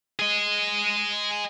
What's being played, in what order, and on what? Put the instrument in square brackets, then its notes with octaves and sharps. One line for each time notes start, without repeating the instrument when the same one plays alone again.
[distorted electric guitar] G#4 D#5